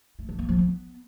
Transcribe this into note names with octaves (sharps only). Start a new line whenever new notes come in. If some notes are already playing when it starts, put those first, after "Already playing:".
A3
E3
A#3
F3
B3